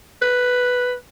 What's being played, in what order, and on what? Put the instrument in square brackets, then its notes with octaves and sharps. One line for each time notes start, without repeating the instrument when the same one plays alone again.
[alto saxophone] B4